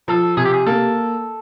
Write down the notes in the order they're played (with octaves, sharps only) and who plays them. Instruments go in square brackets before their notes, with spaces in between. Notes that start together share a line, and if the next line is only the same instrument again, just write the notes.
[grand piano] F3 [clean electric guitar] A4
[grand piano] C3 [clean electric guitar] G#4
[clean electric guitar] G4
G#4
[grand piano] A#3 [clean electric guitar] A4